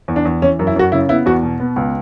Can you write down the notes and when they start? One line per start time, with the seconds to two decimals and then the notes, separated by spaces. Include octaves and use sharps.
0.08 E2
0.16 D4
0.25 E2
0.42 E3 C#4
0.59 F#2
0.67 E4
0.76 F#2 F#4
0.92 C#3 E4
1.09 B3 E4
1.26 E2 F#4
1.43 B2
1.60 B3
1.76 C#2